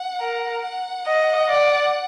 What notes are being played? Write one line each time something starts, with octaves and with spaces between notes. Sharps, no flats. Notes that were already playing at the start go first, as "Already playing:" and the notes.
Already playing: F#5
A#4
F#5
D#5
D5